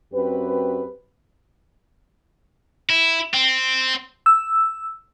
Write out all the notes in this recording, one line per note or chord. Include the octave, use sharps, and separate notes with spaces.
F#2 C4 G4 B4
E4
C4
E6